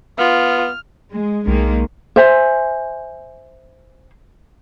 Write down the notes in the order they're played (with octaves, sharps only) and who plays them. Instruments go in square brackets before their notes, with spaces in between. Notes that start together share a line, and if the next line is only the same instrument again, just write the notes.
[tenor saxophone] B3 [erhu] F4 [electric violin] F6
[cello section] G#3
[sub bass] B1 [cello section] D#3 G#3 A#3
[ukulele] C5 E5 G#5